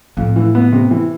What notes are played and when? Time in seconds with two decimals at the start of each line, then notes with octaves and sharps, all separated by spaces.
0.17 F2 A2
0.36 E3
0.55 B3
0.72 C3
0.91 E3